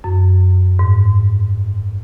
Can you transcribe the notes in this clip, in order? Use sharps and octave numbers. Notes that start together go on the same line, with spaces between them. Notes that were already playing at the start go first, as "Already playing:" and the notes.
F#2
G#2